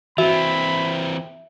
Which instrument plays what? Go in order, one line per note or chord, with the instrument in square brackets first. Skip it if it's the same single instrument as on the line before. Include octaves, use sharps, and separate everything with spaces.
[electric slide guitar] E3 C4 [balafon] F#4 [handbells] E5 [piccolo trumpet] B5